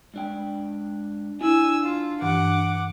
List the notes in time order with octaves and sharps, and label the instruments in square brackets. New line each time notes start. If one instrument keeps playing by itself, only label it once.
[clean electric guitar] G#2 D4 G5
[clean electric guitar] D4 [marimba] E4 [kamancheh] G#5 E6
[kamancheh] F4
[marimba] G2 E3 [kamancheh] F#5 D6